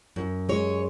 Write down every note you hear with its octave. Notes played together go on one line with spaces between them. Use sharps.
F#2
G#3 C#5